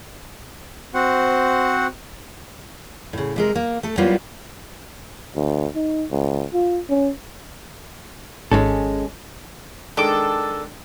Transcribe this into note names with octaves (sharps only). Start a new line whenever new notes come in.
C4 F#4 C5 F#5
A2 C#3
C3 G#3 A#4
A#3
A3 A4
F#3 G3 A#3 B3 E4 F4
D2
D#4
C#2
F4
C#4
G#1 G#3 C#4 A4
D#3 G#3 D4 A4 D6